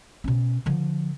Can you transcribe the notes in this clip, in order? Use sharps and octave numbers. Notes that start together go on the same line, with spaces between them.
B2 C#4
D3 F3